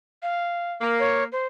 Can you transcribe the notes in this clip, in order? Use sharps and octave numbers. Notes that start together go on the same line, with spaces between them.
F5
A#3
C#5
C5